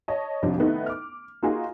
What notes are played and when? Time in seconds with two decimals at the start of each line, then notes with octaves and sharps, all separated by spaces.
0.08 C#5 D#5 A5
0.42 A1 F2 C3 F3 D4
0.58 D#3 A3 B3 D#4 E4
0.86 D6 F6
1.43 A#3 D#4 F4 F#4 G#4